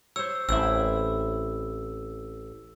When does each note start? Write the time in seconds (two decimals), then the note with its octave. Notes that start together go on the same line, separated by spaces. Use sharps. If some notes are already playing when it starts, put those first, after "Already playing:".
0.16 C5 C#5 E6
0.49 A1 C4 E4 E6